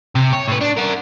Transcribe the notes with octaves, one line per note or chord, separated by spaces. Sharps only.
C3
C#5
A2 B4
D4
A#4 F#5